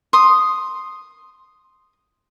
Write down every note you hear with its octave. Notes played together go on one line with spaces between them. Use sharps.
C6 D#6